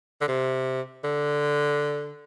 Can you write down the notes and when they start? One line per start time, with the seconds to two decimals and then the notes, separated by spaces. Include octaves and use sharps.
0.21 D3
0.28 C3
1.04 D3